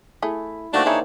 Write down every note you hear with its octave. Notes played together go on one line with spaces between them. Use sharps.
A3 E4 G#4
D#3 A3 A#3 D4 F#4 C5 D5
E3 D#4 E4 G#4 C#5